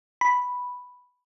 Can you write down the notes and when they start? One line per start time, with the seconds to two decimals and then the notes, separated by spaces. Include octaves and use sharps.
0.21 B5